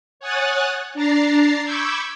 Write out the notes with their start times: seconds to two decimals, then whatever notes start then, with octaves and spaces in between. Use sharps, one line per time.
0.20 C#5 F#5 G#5 D#6 F#6 A6
0.94 D4 A#5 A6 C7
1.64 B5 C#6 D6 E6 G6 G#6